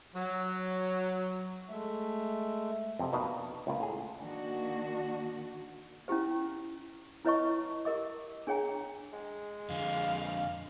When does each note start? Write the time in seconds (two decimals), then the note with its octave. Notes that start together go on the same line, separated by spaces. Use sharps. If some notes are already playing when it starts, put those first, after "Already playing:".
0.15 F#3
1.69 G#3 A3 E5
2.99 F2 C3
3.13 B2 A#3 D4 D#4
3.67 C#2 A#2 A#3
3.80 A2 G#4
4.21 D#3 A#3 D4 F#4
6.08 C#4 D#4 E4 G4 C5
7.25 E4 B4 C#5 D#5 A5 C#6
7.85 G4 A#4 D#5 D6
8.47 D4 G#4 C#5 G5 A#5
9.13 G#3
9.70 F2 D3 F5